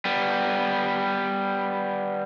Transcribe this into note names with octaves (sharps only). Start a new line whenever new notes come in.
G3 B3